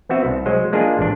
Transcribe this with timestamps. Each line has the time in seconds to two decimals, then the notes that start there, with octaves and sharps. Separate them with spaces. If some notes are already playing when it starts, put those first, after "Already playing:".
0.09 B3 C4 F#4 E5
0.25 C2
0.46 F#3 G#3 C5
0.73 G#3 A#3 D4 F4 G#4
0.99 A1 D4